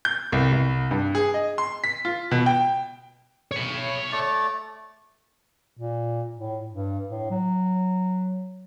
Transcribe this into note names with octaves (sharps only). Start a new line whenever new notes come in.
G6
C2
C2
G2
G#4
D#5
C6
B6
F4
B2
G5
C#5 B5
A3 D5
A#2
A2
G2
A2
F#3